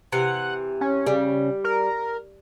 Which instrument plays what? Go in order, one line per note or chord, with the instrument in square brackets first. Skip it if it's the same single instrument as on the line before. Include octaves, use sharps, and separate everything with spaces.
[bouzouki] C3 E3 [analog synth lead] F#5
[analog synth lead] C#4
[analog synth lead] C#3 [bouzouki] G3
[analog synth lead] A#4